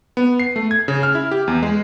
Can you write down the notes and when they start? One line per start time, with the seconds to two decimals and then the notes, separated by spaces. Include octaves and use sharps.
0.17 B3
0.40 C7
0.56 A3
0.71 G#6
0.88 C#3
1.03 F6
1.15 E4
1.31 G4
1.48 E2
1.62 G#3